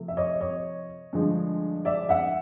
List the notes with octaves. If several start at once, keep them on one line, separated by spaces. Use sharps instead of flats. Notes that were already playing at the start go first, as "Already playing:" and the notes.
Already playing: C3 F3 A3
E5
C#5 D#5
C#5 D#5
G2 D3 F3 G#3
D5 E5
E5 F#5